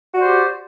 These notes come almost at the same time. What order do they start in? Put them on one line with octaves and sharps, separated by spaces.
F#4 D5 C5 G4